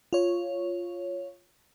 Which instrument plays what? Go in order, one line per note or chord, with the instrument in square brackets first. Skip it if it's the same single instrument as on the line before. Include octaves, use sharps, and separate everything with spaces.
[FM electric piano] F4 C#5